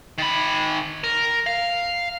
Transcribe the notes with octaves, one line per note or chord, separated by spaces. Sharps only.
D#3 B5
A#4
F5